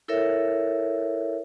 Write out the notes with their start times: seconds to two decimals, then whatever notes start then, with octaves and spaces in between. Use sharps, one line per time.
0.08 E4 A4 A#4 C#5 E5